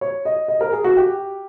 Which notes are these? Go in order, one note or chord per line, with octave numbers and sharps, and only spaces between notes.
C#5
D#5
D#5
A#4
G#4
F#4
G4